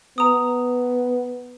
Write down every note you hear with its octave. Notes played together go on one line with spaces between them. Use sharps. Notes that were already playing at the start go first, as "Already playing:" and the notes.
B3 A#5 D#6